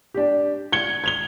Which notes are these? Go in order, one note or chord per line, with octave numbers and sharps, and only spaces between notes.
D4 G4
G#6 C#7 G7
G#6 F7 G7